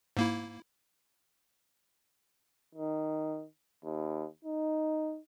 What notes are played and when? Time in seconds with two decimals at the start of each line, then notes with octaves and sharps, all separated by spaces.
0.17 G#2 A#3 E4
2.75 D#3
3.84 D#2
4.44 D#4